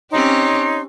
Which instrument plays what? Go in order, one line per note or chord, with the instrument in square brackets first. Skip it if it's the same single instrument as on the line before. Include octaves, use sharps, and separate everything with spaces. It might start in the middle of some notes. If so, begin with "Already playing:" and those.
[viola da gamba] C4 C#4 G4 [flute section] D#4 C#5 C6